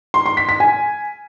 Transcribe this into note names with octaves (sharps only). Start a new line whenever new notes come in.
C6
C6
B6
B6
G#5